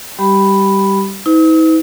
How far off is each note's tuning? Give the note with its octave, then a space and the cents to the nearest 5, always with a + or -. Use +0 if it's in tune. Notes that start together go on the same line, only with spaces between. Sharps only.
G3 +0 G4 -15 B5 +0
D#4 +45 B4 +45